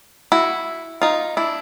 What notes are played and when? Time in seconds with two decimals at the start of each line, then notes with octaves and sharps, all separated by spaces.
0.32 E4 F#4
1.02 D#4 F4
1.37 D4 E4